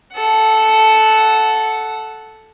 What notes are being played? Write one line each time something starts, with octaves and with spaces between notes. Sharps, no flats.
A4 F#5